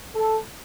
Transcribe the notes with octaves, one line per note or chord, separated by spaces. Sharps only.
A4